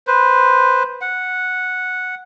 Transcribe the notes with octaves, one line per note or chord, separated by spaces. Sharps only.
B4 C5
F#5